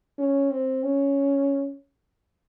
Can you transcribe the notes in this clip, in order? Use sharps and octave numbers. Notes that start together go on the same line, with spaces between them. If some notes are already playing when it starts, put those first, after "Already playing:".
C#4
C4
C#4